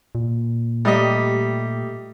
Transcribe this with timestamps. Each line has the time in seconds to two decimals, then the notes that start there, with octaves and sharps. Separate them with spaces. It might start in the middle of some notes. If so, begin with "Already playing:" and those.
0.15 A#2
0.85 G3 A3 G4 D#5 B6